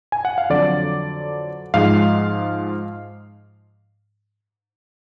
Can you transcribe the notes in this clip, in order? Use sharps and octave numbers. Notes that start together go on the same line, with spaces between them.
G#5
F#5
F5
F2 D3 F#3 D5
G#2 F3 G#3 F5